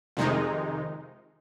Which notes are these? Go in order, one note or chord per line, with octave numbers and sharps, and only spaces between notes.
F2 C3 D#3 G#3 D#4